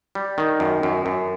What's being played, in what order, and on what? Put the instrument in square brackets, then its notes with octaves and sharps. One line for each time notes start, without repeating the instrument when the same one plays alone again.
[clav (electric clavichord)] G3
D#3
F#2
F#2
F#2